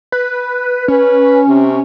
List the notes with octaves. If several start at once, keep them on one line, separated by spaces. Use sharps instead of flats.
B4
C#4 B4
C3